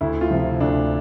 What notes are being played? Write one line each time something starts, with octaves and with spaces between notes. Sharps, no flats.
D2 E4
F4
C3 F3
D2 D4